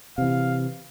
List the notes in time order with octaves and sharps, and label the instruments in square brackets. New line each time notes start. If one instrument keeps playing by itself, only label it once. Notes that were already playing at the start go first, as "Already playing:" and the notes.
[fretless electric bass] C3 E3 [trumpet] F5